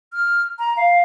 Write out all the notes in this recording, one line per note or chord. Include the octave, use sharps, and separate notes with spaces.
F6
A#5
F5